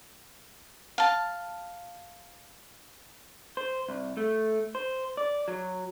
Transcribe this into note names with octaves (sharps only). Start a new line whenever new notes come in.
F5 A5
C5
C2
A3
C5
D5
F#3